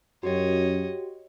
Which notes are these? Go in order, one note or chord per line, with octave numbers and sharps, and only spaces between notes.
F#2 F#4 G4 C#5 D#5